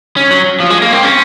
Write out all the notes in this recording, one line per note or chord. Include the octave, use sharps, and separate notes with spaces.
C#4
F#3
F3
G#3
A#3
C4
C#4